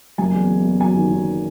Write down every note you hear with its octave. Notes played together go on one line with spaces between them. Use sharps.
F#1 G#5
E2
E2
E2
F#3 G#5
D#3
D#3